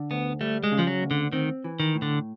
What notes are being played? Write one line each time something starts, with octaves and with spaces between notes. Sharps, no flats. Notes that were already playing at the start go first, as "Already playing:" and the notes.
Already playing: D3
D2 B3
G3 A3
G#3
C#3
F3
F#3
D2
D3
D#3 C4
E3
D#3
A2
D3